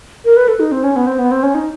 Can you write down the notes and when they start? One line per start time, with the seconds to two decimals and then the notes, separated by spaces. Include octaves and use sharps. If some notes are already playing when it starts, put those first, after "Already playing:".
0.25 A#4
0.37 B4
0.48 A4
0.60 D#4
0.72 C4
0.84 C#4
0.96 B3
1.07 C4
1.19 B3
1.31 C4
1.43 C#4
1.55 D#4